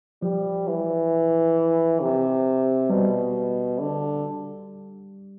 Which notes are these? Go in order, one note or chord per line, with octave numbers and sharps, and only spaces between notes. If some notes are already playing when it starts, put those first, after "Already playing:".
F3 G3
E3
C3
B2 G3
D3